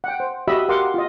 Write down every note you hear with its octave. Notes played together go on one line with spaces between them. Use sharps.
F#5 G5
C5
F#4 G4 D#5 E5 B5 E6
G4 A#4 F5 F#5 C6 D6
F4 D#5